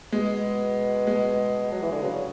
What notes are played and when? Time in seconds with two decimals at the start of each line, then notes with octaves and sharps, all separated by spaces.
0.12 B2 G#3
1.07 G#3
1.72 F#3
1.82 E3
1.92 D3
2.02 C#3 F#3